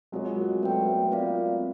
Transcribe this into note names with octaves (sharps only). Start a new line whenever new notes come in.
F#3 G#3 C4 F4 A#4 D#5
G#3 A#3
A3 B3 F#4 B4 D5 G5
A3 B3
C4 F4 A#4 D5 F5